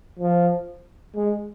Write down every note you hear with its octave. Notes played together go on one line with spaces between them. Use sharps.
F3
G#3